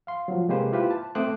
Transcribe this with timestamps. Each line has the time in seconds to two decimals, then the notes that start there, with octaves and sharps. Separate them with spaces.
0.07 F5 C6
0.28 F3 F#3
0.48 C3 G#3 A#3 G4 B4 C5
0.72 E4 F4 G4 B4 C5
0.91 A5
1.15 A3 C4 C5 D6 D#6 F#6